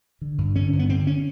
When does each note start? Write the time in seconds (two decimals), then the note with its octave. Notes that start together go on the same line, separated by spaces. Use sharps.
0.21 D3
0.38 G2
0.56 D3 C#4
0.73 G2
0.79 B3
0.89 D3 C4
1.07 C#4